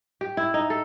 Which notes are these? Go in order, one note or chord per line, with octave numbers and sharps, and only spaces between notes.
G4
E4
D#4
A4